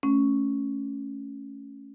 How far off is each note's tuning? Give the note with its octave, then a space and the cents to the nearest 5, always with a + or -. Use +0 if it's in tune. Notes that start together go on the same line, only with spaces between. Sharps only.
A3 +0 C#4 +0